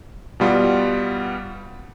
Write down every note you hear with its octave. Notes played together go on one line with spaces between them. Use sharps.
B2 G3 B3 F4